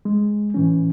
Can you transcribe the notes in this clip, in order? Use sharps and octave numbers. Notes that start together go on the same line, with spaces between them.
G#3
A2 E3 C#4